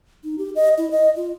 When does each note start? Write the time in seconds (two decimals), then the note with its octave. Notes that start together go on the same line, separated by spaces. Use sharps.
0.24 D#4
0.38 G4
0.56 D#5
0.78 E4
0.91 D#5
1.16 F4